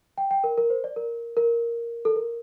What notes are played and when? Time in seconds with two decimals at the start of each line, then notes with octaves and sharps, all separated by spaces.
0.18 G5
0.31 G5
0.44 A#4
0.58 A#4
0.70 C5
0.84 D5
0.96 A#4
1.37 A#4
2.05 A4
2.16 A#4